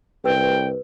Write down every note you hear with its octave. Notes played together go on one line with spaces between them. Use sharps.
C2 G4 B4 G5 E6